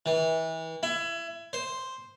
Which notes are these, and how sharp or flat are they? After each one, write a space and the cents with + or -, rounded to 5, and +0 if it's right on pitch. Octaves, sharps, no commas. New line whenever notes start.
E3 -30
E4 +25
C5 +0